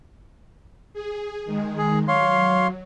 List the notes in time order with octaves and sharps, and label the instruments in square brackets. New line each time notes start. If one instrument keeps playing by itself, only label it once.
[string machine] G#4
D#3 G#3
[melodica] G#4
[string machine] F#3 [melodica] C#5 F5 C6